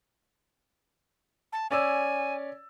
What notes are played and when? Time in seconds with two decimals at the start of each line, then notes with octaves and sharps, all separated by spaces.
1.53 A5
1.71 C#4 D5 G#5 E6